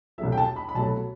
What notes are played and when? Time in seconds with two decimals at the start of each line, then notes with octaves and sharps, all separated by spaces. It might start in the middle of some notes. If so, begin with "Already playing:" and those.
0.18 C2 B2 F#3 A3 E5
0.32 G5
0.38 A5
0.56 B5
0.69 B5
0.74 C2 B2 F#3 A3 A5